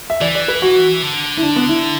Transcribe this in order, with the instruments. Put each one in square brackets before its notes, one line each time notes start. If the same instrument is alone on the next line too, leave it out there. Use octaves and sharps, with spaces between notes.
[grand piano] E5
[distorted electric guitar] E3 [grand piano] D5
[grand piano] D5
B4
F#4
[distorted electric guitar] D3
[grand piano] E4
D4
B3
E4